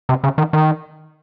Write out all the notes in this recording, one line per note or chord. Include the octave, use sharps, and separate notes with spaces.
C3
C#3
D#3
D#3